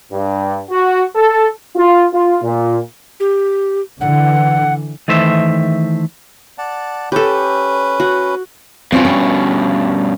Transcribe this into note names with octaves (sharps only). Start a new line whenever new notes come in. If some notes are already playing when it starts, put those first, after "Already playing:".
G2
F#4
A4
F4
F4
A#2
G4
D3 E3 F#5
D#3 E3 A3 C5 E5
D5 F#5 A5
C#4 G4 A4 B4
F#4
G2 B2 C4 C#4 F4
C#4